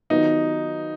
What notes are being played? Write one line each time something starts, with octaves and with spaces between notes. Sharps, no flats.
D#3 F#3 B3 D#4 F4